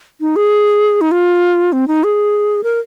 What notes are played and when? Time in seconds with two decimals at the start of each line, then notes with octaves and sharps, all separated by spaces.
0.21 D#4
0.36 G#4
1.01 D#4
1.11 F4
1.73 C4
1.88 D#4
2.04 G#4
2.64 A#4